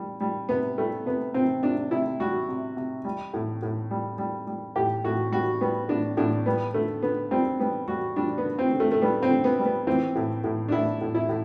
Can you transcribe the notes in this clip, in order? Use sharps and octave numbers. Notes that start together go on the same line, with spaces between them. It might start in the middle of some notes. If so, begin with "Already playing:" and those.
Already playing: G3
G3
C3 B3
G3 A3
C3 B3
C3 C4
C3 D4
C3 E4
G3 F#4
C3
C3
G3
A2
A2
G3
G3
G3
A2 G4
A2 F#4
G3 F#4
G3 B3
A2 D4
A2 D4
G3 B3
D3 A3
D3 B3
G3 C4
G3 B3
G3 F#4
G3 D4
B3
D3
C4
D3
A3
A3
G3 B3
C4
D3
B3
G3
B3
E3 C4
A2
A2
D4
A2 E4
A2
E4
A2